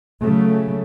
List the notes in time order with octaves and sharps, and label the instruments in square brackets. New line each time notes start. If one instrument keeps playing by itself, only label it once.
[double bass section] C#3 F#3 A3